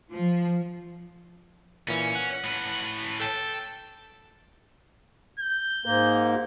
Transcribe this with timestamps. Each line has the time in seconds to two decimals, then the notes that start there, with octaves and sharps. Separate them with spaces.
0.11 F3
1.88 A#2 E3 C#4
2.15 F#5 F#6
2.44 A2 B4
3.20 A4 G5 A5
5.40 G6
5.85 G#2 A#3